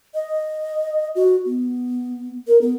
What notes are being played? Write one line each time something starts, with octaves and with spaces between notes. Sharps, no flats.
D#5
F#4
B3
A#4
B3